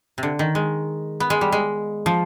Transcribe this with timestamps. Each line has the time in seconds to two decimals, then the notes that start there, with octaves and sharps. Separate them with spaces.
0.18 C3
0.23 D3
0.39 D#3
0.55 G#3
1.20 B3
1.30 G#3
1.41 G3
1.52 G#3
2.06 F3